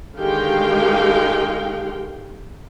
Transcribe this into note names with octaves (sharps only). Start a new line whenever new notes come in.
D3 D#3 G#3 G4 F5 G5